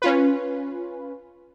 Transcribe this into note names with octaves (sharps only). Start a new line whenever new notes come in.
C#4 F4 B4